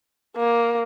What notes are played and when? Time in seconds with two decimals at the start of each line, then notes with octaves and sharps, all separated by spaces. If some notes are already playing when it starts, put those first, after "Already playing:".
0.36 A#3